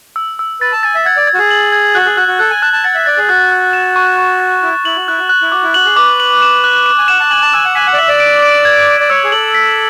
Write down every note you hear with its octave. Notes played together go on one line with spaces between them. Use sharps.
E6
E6
B4 A6
A5
G#5 A6
E5
F#5 G#6
D5
G#6
F#4
G#4
F#7
G#6
F#4 F#6
G#4
F#4 F#6
F#4
A4 F#6
G#5
A5 F#6
A5
F#5 A6
E5
D5 A6
G#4
F#4 F#6
F#6
E7
C#6
C#6
A6
E4 F#6
E4 F#7
F#4
E4 F#6
F#4
F#6
E4
F#4 D6
E4
F#4 F#7
G#4
B4 D6
F#7
E7
F#6
E7
G#5
F#5 E7
A5
G#5 F#7
A5
G#5 E6
F#5
G#5 B6
F#5
D5
E5 F#7
D5
D7
D7
G#6
G#6
D5
C#5 E6
G#4
A4 F#7
B6